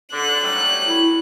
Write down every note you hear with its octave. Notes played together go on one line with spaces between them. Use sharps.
D3 F#6
F#3 G3 A3
E4